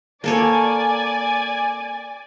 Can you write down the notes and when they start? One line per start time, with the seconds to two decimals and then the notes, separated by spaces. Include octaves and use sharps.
0.24 A#3 A4 C#5 D5 G#5